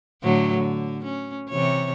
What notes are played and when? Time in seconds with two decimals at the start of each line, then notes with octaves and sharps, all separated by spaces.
0.23 A2 D3 F#3
0.57 D3
1.05 C#4
1.49 C3 E3 C#5